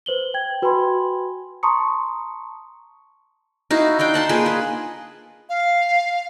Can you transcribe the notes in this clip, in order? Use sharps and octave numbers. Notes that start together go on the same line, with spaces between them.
B4 C5 F#7 G7
G5 G#6
F#4 B4 G5 G#5 B5 C6
A5 A#5 C6 C#6 D#6 C#7
D#4 E4 F#4 F5
D4 D#4 F5 G5
F#5 A5 C6
A#3 F4 G#4 B4
G#4
F5